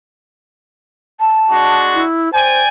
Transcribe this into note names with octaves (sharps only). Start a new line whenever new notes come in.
A5
G#3 D4 F#4
E4
C5 D5 G5 G#5